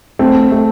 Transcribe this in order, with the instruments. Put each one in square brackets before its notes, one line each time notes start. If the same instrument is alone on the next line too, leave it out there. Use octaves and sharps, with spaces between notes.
[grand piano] A3 [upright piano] C4
[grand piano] A3